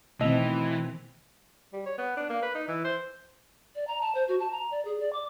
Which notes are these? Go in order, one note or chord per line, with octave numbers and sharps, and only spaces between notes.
B2 D#3 E3 A3 C4 D#5 F7
G3
C#5
B3
D4
A#3
B4
D#4
E3
C5
D5
A#5
A5
C5
F#4
A5
A#5
D5
G#4
D5
D6